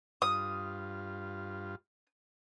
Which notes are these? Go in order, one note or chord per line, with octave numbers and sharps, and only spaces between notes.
G2 F4 D#6